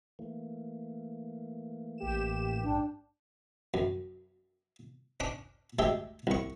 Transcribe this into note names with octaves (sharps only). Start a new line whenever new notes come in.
E3 A3 A#3
A1 G4 E7
A#1 G#2 D4 G5
F#2
C#4 D4 D6
D2 G#3 G4 E5
C2 C#6